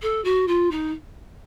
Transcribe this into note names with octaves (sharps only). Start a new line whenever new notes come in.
A4
F#4
F4
D#4